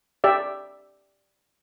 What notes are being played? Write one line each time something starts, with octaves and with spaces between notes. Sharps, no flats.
G4 D5 E5